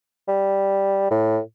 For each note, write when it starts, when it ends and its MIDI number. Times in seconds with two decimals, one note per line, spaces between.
0.28 1.11 55
1.11 1.40 45